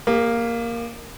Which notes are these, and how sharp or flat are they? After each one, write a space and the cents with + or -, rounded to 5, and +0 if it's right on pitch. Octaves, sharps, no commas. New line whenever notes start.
A#3 +0 G4 +45